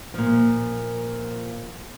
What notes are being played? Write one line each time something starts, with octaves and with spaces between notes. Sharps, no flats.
A#2 F3